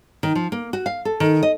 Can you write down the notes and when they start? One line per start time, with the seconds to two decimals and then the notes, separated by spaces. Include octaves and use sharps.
0.23 D#3
0.35 F3
0.52 A#3
0.73 F#4
0.86 F5
1.05 A4
1.20 D#3
1.43 D#5